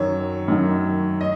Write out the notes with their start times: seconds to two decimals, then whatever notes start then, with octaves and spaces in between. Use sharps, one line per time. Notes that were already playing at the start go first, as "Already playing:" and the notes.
Already playing: F#2 D#3 F#3 C#5
0.48 F#2 D#3 F#3
1.21 D#5